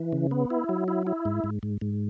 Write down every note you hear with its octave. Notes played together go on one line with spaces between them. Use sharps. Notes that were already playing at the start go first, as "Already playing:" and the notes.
Already playing: E3
C#3
B3
E4
F#3
E4
E4
G#2
G#2
G#2
G#2